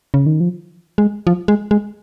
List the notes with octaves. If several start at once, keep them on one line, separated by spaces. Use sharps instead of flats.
C#3
D#3
F3
G#3
F3
G#3
G#3